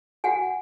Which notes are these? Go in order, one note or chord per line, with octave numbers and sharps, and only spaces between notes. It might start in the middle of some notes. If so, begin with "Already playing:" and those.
F#4 F#5 G#5